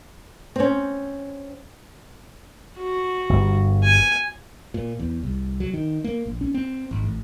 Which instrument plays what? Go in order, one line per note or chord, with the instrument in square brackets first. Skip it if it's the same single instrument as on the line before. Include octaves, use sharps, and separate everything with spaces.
[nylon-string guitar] C4 C#4
[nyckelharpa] F#4
[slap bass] G1
[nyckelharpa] G#5
[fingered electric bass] A#2
E2
C2
F#3
D#3
A#3
A#1
C#4
C4
G#1
A1